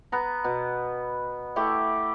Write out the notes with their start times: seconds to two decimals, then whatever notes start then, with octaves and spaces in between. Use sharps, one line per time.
0.12 B3 A#5
0.44 B2
1.56 A3 E4 G4